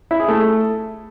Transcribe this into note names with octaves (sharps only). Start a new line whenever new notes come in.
E4
G#4
A3